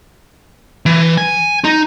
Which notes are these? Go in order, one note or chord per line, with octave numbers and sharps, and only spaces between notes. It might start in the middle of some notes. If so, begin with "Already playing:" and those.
E3
G#5
D#4